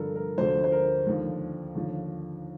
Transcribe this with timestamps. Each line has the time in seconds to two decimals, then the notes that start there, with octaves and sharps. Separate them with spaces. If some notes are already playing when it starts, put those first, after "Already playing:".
Already playing: G2 D3 F3 A4 A#4
0.16 A#4
0.37 D2 D3 F3 C5
0.64 C5
0.72 A#4
1.07 D#2 D3 F3
1.75 D#2 D3 F3